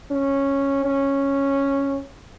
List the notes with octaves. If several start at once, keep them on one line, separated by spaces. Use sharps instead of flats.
C#4
C#4